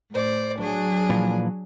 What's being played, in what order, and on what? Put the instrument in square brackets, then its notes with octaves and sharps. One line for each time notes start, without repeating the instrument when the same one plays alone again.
[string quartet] A2 C5 D5
[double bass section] F#3 [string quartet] D4 G#4
[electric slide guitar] A#2 E3 F3